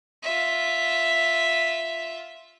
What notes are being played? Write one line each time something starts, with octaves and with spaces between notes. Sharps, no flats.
F4 E5